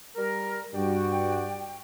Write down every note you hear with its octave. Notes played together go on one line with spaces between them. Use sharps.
G3 A#4
G2 F#4 G4 D5 G5